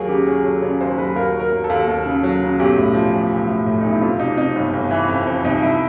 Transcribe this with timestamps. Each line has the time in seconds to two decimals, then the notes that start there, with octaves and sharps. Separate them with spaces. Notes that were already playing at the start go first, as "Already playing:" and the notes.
Already playing: D#2 F#3 G#4 A#4
0.09 C#3 G4
0.27 F#3 G#4
0.44 F#3 A4
0.62 C#3 C#5
0.80 D#2 C5
0.98 F#3 B4
1.15 D#2 A#4
1.33 F#3
1.40 A#4
1.52 D#2
1.64 A4
1.70 D#2
1.88 D#2
2.06 C#3
2.23 F#3
2.41 C#3
2.59 B1 G4
2.76 A2
2.94 F3
3.12 B1
3.31 B1
3.47 A2
3.66 A2
3.81 B1 D#4
3.91 E4
4.01 F2 F4
4.19 C3 D#4
4.37 C3 D#4
4.56 G1
4.73 G1
4.91 E3
5.09 F2
5.27 F2
5.45 C2 D#4
5.62 C2 E4